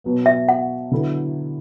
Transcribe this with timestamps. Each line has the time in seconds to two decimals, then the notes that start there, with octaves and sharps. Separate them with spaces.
0.04 B2 F#3 B3
0.26 E5
0.49 F#5
0.91 D3 F#3 B3 E4 A4